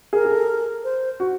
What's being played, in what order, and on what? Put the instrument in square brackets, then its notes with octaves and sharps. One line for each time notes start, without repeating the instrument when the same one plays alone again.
[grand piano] G#4 [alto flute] A#4
[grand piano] G#4
A4
[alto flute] C5
[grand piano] F#4